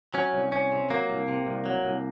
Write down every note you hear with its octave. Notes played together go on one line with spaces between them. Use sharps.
F#3 C#4
C2
C2 C#4
C3
F#3 A#3
C2
C3
C2
F#3
C2